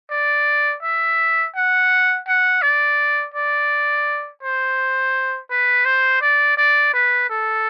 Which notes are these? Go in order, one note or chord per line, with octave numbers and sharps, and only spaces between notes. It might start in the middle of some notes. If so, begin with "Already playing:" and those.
D5
E5
F#5
F#5
D5
D5
C5
B4
C5
D5
D5
B4
A4